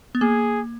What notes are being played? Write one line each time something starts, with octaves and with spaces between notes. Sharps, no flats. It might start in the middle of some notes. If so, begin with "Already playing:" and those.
B3
A#3 G#4